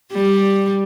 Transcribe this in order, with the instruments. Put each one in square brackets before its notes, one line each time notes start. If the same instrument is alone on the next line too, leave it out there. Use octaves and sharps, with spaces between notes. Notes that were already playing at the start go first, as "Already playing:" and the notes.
[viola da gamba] G3